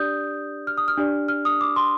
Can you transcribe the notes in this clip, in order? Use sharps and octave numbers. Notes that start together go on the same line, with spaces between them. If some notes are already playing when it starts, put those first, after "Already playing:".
Already playing: D4 G4 D5 D#6 G6
F6
D#6
F6
D4 G4 D5
F6
D#6
D6
C6